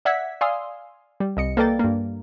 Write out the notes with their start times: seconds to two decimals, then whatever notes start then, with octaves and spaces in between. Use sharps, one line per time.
0.05 D5 E5 F#5 E6 G#6 B6
0.41 D5 F5 G#5 C6 D#6 E6
1.20 G3
1.37 C2 D#5 C#7
1.57 A#3 A4 B4 D5 G5 A6
1.79 G2 A#3